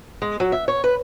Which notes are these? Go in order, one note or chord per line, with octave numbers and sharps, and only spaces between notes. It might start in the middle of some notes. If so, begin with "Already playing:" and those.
G#3
F#3
E5
C#5
B4